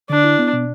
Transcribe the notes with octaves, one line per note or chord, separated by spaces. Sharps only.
D3 D4
E4
B3
B2